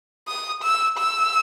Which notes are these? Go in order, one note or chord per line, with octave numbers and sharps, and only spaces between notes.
D#6
E6
E6